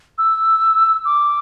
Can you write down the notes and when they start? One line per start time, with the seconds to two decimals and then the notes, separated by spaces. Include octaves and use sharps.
0.18 E6
1.05 D6